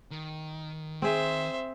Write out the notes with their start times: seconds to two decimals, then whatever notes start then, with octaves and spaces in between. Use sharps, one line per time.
0.11 D#3
1.02 C4 G#4 C5 E5